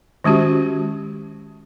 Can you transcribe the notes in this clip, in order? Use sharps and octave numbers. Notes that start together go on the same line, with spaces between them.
D#3 G#3 C#4 F#4 G4